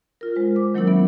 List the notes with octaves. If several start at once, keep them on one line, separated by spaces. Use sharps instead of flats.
F4 A#4
G#3 C5
D6
D#3 F#3 A#3 C#4 E4 A#4
B3 A#4 E5